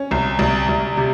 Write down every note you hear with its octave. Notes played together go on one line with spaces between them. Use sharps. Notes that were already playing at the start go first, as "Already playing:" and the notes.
Already playing: C#4
C2
C2
C2
C3